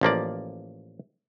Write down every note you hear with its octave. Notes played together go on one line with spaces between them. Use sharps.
A1 F3 A#3 D5